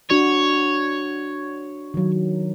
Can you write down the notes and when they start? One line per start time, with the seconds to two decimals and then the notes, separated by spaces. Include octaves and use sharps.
0.10 D4 F#4 C#5 D5
1.94 D#3 F#3